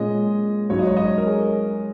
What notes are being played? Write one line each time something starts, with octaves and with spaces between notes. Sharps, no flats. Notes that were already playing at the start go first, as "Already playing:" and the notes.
Already playing: A#2 G#3 C#4 D#5
G#2 F#3 C#4 C#5
D#5
C#5
D#5
C#5
A#4
G#4